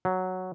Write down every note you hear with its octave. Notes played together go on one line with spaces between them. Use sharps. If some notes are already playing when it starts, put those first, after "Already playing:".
F#3